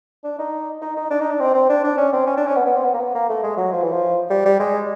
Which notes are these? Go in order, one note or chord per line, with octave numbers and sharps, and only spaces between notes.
D4
D#4
D#4
D#4
D4
D#4
D4
C4
C4
D4
D4
C#4
C4
C#4
D4
C#4
B3
B3
C4
B3
A#3
B3
A#3
A3
G#3
F#3
F3
E3
F3
G3
G3
G#3